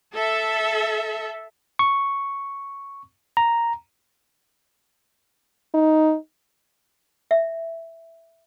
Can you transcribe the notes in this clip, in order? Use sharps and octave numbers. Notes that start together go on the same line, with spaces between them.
A4 E5
C#6
A#5
D#4
E5